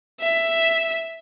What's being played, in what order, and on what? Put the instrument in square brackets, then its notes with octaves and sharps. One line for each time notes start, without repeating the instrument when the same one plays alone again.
[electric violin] E5